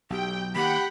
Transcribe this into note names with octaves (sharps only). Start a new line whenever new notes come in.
B1 G4 G5
D#3 A#3 G4 F#5 G5 B5